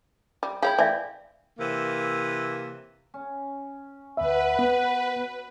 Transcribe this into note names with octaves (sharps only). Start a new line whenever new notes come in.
G3
E4 G#4 C#5 F5 G5 B5
E3 D5 E5 F5
C3 E3 A#3
C#4
D2 B3 B4 E5
B3 F#4